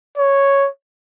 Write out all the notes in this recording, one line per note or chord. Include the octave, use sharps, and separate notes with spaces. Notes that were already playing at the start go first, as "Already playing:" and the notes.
C#5